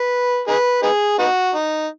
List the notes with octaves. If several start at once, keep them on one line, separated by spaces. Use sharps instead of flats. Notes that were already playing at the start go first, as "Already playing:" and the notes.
Already playing: B4
D#4 G#4 B4
B3 D#4 G#4
B3 D#4 F#4
D#4